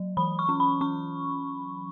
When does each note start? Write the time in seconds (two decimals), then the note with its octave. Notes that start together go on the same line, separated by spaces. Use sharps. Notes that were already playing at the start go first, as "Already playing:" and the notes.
Already playing: F#3
0.17 E3 B5
0.39 C#6
0.49 C#4
0.60 B5
0.81 C#4 C#6